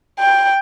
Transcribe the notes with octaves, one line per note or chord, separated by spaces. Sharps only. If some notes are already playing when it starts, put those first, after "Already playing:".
G5